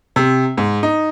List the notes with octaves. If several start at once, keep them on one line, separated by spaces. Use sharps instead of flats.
C3
G#2
D#4